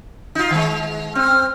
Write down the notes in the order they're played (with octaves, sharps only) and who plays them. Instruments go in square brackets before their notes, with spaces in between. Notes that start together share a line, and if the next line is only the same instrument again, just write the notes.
[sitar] D#4 F4
D#3 G#3
[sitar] C4 [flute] F6